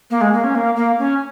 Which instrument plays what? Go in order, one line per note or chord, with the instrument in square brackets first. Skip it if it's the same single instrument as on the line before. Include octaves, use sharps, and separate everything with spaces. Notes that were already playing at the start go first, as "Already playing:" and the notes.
[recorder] A#3
G#3
A#3
C#4
A#3
A#3
C#4